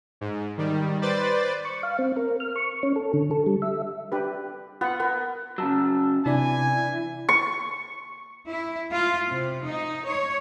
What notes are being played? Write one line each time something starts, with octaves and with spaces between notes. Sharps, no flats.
G#2
D#3 G3
B4 C5 D5 A6
C#6
F5
C4
A#4
F6
C#6
C#4
A4
D3
A4
G3
E5
D4 G4 B4
B3 F4 F#5
B3 A#4
C#3 F#3 A5 E6
C3 E3 D4 D5 G#5
C#6
E4
F4
C3
D#4
C#5